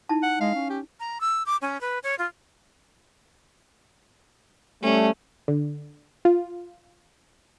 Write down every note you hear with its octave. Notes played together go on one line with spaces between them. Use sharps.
D#4 E4 A5
F#5
G#3 F5
C#4
G4
A#5
E6
D6
C#4
B4
C#5
F4
G3 A3 C#4
D3
F4